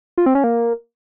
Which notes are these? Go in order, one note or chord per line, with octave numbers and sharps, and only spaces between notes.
F4
C4
C#4
A#3